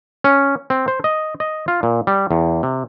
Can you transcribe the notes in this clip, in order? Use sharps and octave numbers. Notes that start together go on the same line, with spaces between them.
C#4
C4
C5
D#5
D#5
F4
A#2
G3
E2
C3